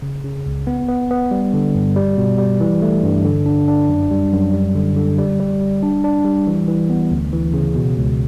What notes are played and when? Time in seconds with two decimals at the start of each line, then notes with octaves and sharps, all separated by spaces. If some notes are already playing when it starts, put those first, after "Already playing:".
0.02 C#3
0.24 C#3
0.46 C#2
0.67 B3
0.89 B3
1.11 B3
1.31 G3
1.53 D3
1.75 G2
1.96 G3
2.17 B2
2.39 G3
2.60 E3
2.82 A3
3.03 G2
3.24 D3
3.46 D4
3.68 D4
3.89 F#2
4.11 G3
4.32 F#2
4.53 G3
4.75 D3
4.96 D3
5.18 G3
5.39 G3
5.60 G3
5.83 D4
6.04 D4
6.25 G3
6.47 E3
6.68 E3
6.90 B3
7.11 D2
7.33 E3
7.54 C#3
7.75 B2
7.98 C#2